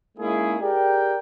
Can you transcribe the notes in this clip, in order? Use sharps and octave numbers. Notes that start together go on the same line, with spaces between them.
G#3 A#3 C#4 D#4 E4 G#4
G4 G#4 A#4 D5 G5